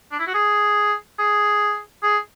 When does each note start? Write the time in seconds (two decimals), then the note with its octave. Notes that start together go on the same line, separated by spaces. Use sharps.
0.12 D4
0.19 E4
0.27 F#4
0.34 G#4
1.19 G#4
2.03 G#4